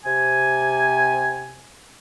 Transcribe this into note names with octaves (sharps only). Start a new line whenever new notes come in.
C3 G#5